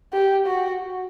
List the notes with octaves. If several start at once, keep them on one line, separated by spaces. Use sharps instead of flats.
G4
F#4